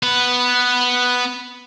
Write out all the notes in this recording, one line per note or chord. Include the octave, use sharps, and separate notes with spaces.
B3 B4